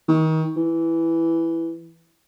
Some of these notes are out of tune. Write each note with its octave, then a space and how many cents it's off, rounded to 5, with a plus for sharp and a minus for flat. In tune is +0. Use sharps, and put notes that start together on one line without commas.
D#3 +30
E3 +5